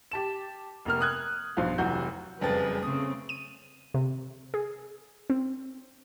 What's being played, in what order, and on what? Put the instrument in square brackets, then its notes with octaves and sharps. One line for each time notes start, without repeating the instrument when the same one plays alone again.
[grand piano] G4 A5 E7
F1 A#3 A#4 F6
D#6 F#6 G#6
B1 G2 F3 C5 F5
F1 E3 F#3 F#4 G6
[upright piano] F#1 F2 A6 [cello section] G3 G#4 B4
[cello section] C#3 A3 C4 [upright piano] D#6
[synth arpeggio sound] D#7
C3
G#4
C4